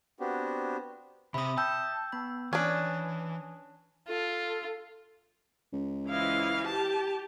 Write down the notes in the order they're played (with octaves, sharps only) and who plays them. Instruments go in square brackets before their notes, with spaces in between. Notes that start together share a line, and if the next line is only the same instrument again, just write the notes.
[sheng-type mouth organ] B3 C4 D4 F#4 G4
[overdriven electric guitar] C3 C4 [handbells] E5 D#6 [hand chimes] B5
[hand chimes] G5 E6 G6 [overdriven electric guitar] A5
[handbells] B3 B5
[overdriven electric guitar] E3 [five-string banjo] C#4 D4 [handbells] G#5 D#6
[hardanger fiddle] F4 [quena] A4
[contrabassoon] C#2
[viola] E3 F5 [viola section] E4 C5 D#5
[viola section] G4 [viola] A5